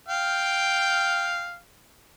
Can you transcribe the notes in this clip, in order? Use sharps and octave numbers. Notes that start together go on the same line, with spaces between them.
F5 G5